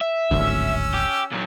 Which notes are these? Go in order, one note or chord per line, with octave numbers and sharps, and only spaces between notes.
E5
D1 G#1 D2 C#4 E6
G4
A#2 F#3